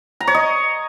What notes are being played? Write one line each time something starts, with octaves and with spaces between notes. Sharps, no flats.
A#5
C#5
D#5